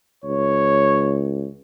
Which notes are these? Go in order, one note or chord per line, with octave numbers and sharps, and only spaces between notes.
C#2 C#5